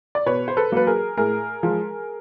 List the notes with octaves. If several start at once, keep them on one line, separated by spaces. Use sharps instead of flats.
D5
B2 B4 C#5
C5
A4 B4
F#3 A#3 B4
G#4 A#4
A2 G#4 A#4
F3 G#3